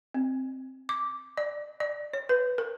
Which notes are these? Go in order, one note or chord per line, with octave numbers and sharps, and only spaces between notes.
C4
D6
D5
D5
C#5
B4
A#4